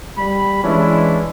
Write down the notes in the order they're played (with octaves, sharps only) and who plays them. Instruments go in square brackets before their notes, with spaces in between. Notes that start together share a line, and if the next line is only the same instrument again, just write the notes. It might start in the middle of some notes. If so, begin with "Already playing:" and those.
[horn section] G3 B5
E3 G#3 C#4 D4 E4